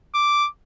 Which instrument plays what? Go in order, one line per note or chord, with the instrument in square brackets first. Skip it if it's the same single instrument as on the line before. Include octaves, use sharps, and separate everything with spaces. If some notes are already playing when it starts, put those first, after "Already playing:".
[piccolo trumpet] D6